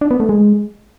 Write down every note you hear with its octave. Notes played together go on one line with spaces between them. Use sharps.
D4
B3
A3
G#3